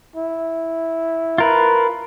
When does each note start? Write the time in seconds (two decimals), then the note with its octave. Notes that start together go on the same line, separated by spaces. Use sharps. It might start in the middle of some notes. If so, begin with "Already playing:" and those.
0.16 E4
1.38 F4 A#4 B4